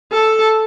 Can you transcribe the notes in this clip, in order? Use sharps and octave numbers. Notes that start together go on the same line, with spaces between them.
A4